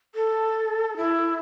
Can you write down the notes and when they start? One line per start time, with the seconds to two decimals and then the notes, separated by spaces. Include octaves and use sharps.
0.15 A4
0.97 E4